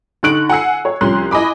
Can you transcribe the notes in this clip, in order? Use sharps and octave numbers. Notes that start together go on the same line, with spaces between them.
D3 D#4 C#6 F#6 D7 F#7
F#5 G#5 E6 C7
C#5
C2 F3 C#4 C6 F#6 C7
E4 D#5 G#5 B5 D6